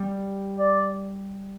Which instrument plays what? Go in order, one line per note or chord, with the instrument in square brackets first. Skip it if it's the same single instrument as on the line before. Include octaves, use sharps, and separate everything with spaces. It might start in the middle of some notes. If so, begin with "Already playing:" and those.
Already playing: [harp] G3
[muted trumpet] D5